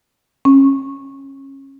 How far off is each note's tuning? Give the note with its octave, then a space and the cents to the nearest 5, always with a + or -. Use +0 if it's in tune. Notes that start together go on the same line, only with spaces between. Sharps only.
C#4 -25